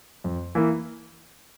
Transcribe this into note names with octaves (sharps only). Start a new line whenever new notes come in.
F2
E3 A#3 E4